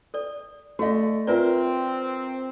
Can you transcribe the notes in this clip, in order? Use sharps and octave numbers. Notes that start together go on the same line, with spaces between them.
A4 D5
A3 F#4 D5 D#5 F5
C4 F4 A#4 B4 D5 E5